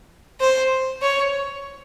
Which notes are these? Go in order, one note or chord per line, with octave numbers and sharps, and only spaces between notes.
C5
C#5